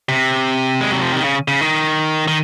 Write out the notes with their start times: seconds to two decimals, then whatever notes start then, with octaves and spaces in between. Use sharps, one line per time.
0.09 C3
0.81 G#3
0.91 F#3
1.02 F3
1.12 D#3
1.23 C#3
1.48 C#3
1.61 D#3
2.28 D#3